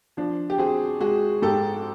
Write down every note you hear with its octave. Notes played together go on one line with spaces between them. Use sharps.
F3 D4
G4
C4 F#4 G#4
G#3 F#4 G#4
G#2 G4 A4